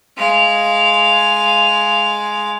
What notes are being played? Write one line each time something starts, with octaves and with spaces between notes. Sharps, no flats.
G#3 F5